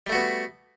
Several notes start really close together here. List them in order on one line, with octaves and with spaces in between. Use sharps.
G3 A3 F#4 B3